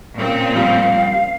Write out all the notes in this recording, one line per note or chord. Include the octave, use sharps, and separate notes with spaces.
A#2 C#3 C4
F3 G3 F5